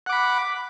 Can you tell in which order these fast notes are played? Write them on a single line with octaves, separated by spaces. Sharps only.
F#5 D6 B5